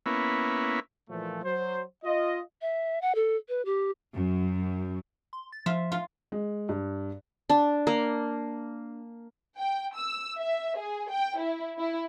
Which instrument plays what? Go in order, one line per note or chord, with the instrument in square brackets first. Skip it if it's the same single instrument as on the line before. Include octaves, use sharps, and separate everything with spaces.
[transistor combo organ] A#3 B3 C#4 E4
[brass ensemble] A#2 E3 F3 A3
F#3 C5
F4 D#5
[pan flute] E5
F#5
A4
B4
G4
[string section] F#2
[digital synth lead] C6
A6
[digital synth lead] F3 [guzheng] F4 E5
[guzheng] F4
[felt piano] G#3
G2
[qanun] D4
A#3
[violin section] G5
E6
E5
G#4
G5
E4
E4